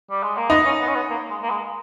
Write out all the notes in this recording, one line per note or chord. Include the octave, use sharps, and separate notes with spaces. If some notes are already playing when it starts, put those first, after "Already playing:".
G3
G#3
A#3
B3 D#4
C#4
B3
C#4
B3
A#3
G#3
A#3
G#3